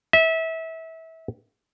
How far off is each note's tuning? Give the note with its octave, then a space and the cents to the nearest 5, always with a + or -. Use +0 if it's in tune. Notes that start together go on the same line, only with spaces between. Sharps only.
E5 -25